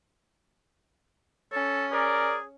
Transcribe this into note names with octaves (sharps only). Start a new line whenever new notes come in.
C#4 A4
G#4 A#4 D5